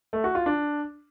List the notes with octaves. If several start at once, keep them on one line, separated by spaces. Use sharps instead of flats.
A3
F#4
F4
D4